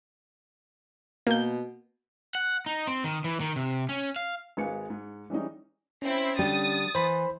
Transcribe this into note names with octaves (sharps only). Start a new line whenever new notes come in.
B2 A#3 G6
F#5
D#4
C4
D#3
E3
D#3
C3
C#4
F5
G#1 G#3 B4 F5 G#5 C#7
G#2
E3 G3 G#3 C#4 D#4
C4 C#4 E4
D3 G3 G4 D#6 A6
E3 C5 B5